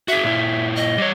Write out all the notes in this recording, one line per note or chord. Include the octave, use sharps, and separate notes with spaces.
F#4 G#4 E5
A#2 E4
D#5
G3 C#5